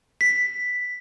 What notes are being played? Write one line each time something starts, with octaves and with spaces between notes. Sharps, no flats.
B6